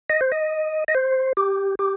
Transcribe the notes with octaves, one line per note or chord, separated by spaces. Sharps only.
D#5
C5
D#5
D#5
C5
G4
G4